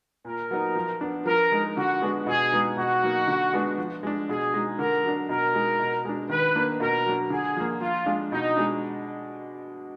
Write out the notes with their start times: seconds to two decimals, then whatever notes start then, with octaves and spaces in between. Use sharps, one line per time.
0.25 A#2 A#4
0.51 F#3 B3 D#4
0.75 F3
1.01 B3 D4
1.26 F3 A#4
1.52 G#3 D#4
1.77 D3 F#4
2.02 G#3 B3 D4
2.27 B2 G#4
2.52 G#3 B3 D#4
2.77 B2 F#4
3.02 F#3 A#3 D#4
3.27 D3
3.53 G#3 B3 D4
3.78 F3
4.03 G#3 D4
4.29 B2 G#4
4.54 G#3 D#4
4.79 D3 A#4
5.03 F#3 D4
5.29 B2 A#4
5.54 G#3 D#4
5.79 B2
6.05 G#3 D4
6.30 D#3 B4
6.55 A#3 D4
6.80 B2 A#4
7.06 F#3 D4
7.30 D3 G#4
7.56 F3 A#3
7.81 F3 F4
8.06 G#3 D4
8.32 B2 D#4
8.57 G#3 D4